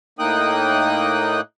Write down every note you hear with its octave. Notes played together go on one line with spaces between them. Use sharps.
A2 A#3 D#4 G5 D#6 F#6